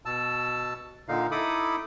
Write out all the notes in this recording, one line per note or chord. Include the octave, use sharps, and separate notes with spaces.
B2 A5 E6
A#2 D3 D#4 F5
D#4 E4 A4 B5 D6 D#6